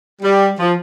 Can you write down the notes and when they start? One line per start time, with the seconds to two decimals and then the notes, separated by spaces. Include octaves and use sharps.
0.22 G3
0.58 F3